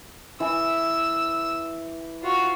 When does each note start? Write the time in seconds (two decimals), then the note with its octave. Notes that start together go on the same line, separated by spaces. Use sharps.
0.40 E3 E6
2.23 F4 F#4